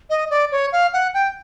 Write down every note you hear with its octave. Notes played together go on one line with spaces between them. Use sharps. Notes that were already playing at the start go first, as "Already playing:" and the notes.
D#5
D5
C#5
F5
F#5
G5